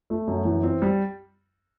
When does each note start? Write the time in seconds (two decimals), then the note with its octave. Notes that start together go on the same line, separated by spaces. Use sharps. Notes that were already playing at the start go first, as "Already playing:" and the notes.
0.10 A3
0.27 F#2
0.45 E3
0.63 C4
0.82 G3